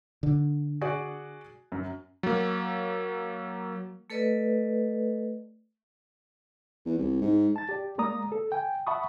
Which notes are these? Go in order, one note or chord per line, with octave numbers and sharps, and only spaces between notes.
D3
F#4 G#4 D5
F#2
F#3 A#3
A3 A4 B4 D5 D#5
E2
C2
G#2
A5 A6
G4 D5
G#3 A#3 D5 A#5 D#6
A4
G5 G#5
E5 F#5 A5 B5 C#6 D#6